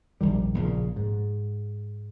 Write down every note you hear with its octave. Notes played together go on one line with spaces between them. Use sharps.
A#1 D#3 G3
A#1 A#2 C#3
G#2